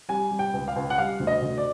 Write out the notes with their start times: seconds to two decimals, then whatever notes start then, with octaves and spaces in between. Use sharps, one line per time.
0.09 G3 G#5
0.31 G3
0.39 G5
0.53 C#2
0.68 F5
0.76 C#2
0.90 F#5
0.98 G3 F5
1.20 D2
1.27 D#5
1.42 D2
1.58 D5